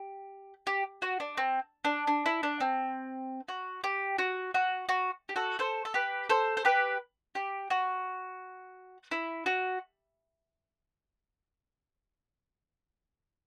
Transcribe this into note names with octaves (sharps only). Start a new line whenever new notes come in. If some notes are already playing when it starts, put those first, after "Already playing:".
Already playing: G4
G4
F#4
D4
C4
D4
D4
E4
D4
C4
F#4
G4
F#4
F#4
F#4
G4
F#4 A4
A4 C5
A4
G4 B4
A4 C5
C5
G4 B4
G4
F#4
E4
F#4